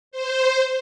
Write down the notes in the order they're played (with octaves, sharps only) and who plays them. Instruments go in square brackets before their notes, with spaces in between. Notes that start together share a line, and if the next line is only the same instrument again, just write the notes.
[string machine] C5